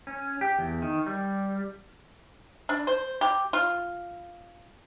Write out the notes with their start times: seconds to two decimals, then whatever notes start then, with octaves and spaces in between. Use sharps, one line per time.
0.07 C#4
0.41 G4
0.59 E2
0.82 D#3
1.06 G3
2.69 D4
2.87 C5
3.21 G4
3.53 F4